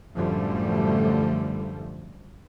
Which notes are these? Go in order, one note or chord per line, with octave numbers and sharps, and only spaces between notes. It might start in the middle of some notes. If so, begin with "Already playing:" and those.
F#2 A2 D3 F3 G3 A3